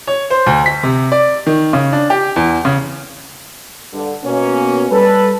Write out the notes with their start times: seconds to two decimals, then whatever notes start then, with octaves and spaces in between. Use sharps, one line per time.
0.07 C#5
0.30 C5
0.46 D2
0.66 B6
0.83 C3
1.12 D5
1.46 D#3
1.73 C#3
1.93 D4
2.10 G4
2.36 E2
2.65 C#3
3.93 G2 D3
4.24 B2 A#3 C#4
4.91 G3 A4 B4